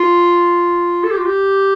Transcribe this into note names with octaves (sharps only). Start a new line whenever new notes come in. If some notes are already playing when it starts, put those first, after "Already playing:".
Already playing: F4
A4
G4
F4
G4